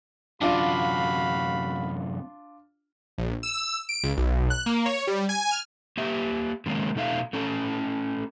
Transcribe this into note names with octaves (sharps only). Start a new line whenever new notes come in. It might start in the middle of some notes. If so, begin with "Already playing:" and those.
F#2 C3 D4 F4 F#4 F5 B5
A#1
E6
D7
C#2
B1
F#6
A#3
C#5
G3
G#5
F6
A#3 G4 E5
D3 D#3 G#3 A#3 C#4
B2 A3 D#4 E5 F5
A3 C#4 A4 A5